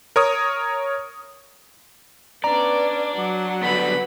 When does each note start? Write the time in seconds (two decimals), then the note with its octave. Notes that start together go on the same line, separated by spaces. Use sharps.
0.16 A#4 C#5 D#6
2.44 B3 C#4 D4 D5 A#5
3.16 F#3 F#5
3.63 D3 G3 B3 B4 B5